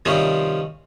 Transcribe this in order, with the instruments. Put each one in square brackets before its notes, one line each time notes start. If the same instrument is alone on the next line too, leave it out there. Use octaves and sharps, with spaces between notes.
[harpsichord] C3 D#3 F3 G3 C4 C#4